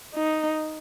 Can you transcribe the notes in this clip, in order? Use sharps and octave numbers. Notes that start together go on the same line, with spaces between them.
D#4